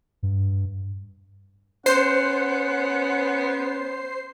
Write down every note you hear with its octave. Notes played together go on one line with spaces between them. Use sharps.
G2
B3 C#4 C5 F#5 C7